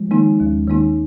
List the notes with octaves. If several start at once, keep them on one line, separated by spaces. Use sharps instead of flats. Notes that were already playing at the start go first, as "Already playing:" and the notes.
Already playing: F3 G#3
D#3 A#3 D#4
D#2
D#3 A#3 D#4